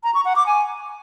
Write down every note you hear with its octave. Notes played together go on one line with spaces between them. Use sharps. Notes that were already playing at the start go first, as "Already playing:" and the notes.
A#5
C#6
F#5
D6
G#5